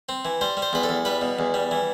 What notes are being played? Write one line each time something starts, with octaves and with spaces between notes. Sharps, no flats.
C4
E3
G3 C5
G3
C5
E2 B4
A4
E2
G3 B4
B2
E2
G3
E3